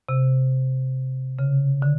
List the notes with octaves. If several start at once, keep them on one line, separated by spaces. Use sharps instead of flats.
C3
C#3
D3